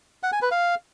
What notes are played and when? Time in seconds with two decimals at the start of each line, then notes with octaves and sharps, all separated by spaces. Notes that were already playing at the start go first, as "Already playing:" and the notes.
0.23 F#5
0.32 G#5
0.42 B4
0.51 F5